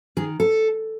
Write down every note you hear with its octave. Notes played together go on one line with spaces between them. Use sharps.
D#3 G#4
A4